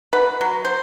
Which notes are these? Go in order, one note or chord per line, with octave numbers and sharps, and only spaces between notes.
B4 F#5 B5
F#3
C5